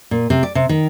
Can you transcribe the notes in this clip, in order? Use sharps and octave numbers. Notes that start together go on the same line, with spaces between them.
A#2
C3
D5
C3
D#3